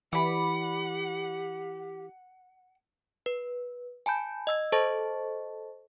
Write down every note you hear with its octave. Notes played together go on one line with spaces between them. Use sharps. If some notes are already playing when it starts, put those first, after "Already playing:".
E3 G4 D5 F#5 B5
B4
G#5 A5 B5 G6
D#5 E6 G#6
A4 C5 D#5 A5 C#6 A6